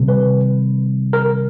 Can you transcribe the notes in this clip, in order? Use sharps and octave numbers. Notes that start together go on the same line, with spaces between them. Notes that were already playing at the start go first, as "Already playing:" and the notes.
Already playing: C3 D#3 G3
B4
A#4